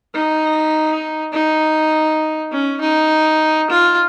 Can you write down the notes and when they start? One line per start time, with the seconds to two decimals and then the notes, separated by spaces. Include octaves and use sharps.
0.15 D#4
1.33 D#4
2.52 C#4
2.81 D#4
3.70 F4